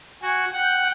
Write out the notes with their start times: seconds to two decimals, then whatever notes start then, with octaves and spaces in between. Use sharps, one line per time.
0.22 F#4 G#5
0.53 F#5 G5